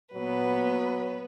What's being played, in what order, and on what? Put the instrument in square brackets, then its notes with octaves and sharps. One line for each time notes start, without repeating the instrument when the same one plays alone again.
[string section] A#2 B3 [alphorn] F#3 [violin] B4